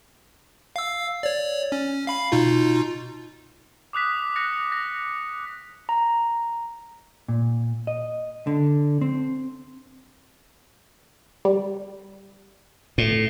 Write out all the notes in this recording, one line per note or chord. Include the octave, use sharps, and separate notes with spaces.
F5 E6
C#5 D5
C#4
F5 B5 C7
B2 D#4 F4
D6 D#6 F#6 B6
F#6 A#6 C#7
A#6
A#5
A#2
D#5
D3
C4
G3
A2